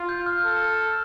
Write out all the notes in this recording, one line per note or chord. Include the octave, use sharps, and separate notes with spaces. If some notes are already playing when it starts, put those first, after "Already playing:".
Already playing: F4
G6
F6
A4